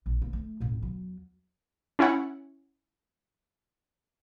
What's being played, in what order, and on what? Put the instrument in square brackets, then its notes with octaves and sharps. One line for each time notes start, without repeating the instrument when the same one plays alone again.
[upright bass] A#1
A#3
A3
D#1 A2
E2 F#3
[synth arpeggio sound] C#4 E4 C#5 F#5